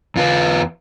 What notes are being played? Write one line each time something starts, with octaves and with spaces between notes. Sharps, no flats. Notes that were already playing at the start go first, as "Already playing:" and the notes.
E2 F4 B4